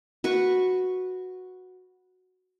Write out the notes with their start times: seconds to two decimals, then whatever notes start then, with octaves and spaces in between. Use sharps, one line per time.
0.24 F#4 B4 C#6